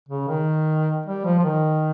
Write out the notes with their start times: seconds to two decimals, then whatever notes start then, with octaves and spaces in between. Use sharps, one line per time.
0.09 C#3
0.28 D#3
1.06 G3
1.25 F3
1.39 F3
1.44 D#3